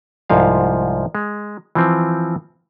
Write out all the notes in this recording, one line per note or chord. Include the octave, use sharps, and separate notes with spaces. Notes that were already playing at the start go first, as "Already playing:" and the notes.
C2 G#2 F3 F5
G#3
E3 F3 C4